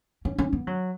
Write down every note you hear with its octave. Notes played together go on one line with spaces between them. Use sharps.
C#4
C#4
B3
F#3